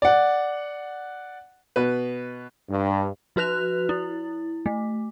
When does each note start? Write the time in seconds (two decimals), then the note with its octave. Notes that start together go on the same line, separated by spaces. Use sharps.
0.02 D5 F#5
1.76 B2 B4
2.70 G2
3.36 F3 F#4 B4 F#6 F7
3.89 E4
4.66 A3